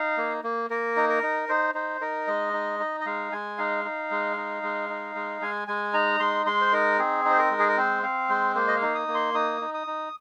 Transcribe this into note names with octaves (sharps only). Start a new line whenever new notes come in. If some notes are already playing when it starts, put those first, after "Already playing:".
Already playing: D#4 F5
A#3
A#3
A#3 A#4
D#4
A#4
D#4
D#4 C5
D#4 C5
D#4 A#4
G#3 D#5
D#4
D#4
D#5
G#3 F5
G#3 G#5
D#4 F5
D#4
G#3
D#4
G#3
D#4
G#3
G#3 G#5
G#3 G#5
D#4 A#5
G#3 C6
G#3 C6
C5
D#4 A#4
C4 G#4
D#4
C5
A#4
G#3
G#4
A#4
C4 C5
C4 F5
G#3 C5
A#3 C5
D#5
F5
D#4
D#6
A#3
C6
D#4 D#6
D#4
D#6
D#4